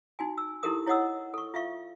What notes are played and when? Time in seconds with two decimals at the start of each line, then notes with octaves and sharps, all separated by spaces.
0.19 D#4 F#4 G#5
0.38 E6
0.63 D#4 E4 G4 A4 A#4 D#6
0.87 E4 C#5 D#5 F#5 D#6 E6
1.34 A4 C#6
1.54 F4 E5 F5 C#6